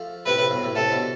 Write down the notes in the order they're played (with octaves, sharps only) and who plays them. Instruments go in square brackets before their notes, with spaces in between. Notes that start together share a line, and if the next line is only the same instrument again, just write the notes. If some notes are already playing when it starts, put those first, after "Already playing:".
Already playing: [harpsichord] F3 A3
[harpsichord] A2 C3 [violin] B4
[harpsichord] A2 C3
G2 B2
A2
[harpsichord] A2 C3 [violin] A4
[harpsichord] B2 D3